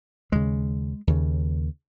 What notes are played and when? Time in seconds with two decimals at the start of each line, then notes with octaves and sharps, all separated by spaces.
0.32 D#2 C#3 G#3
1.07 D#2 C#3